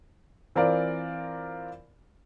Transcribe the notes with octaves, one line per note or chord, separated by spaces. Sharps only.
E3 C4 F4 A#4 D5